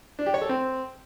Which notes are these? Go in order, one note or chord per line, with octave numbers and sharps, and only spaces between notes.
D4
G4
C#5
A4
C4